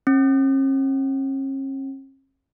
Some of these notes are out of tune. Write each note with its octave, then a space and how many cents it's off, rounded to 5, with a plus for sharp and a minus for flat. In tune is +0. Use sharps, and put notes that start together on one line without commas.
C#4 -45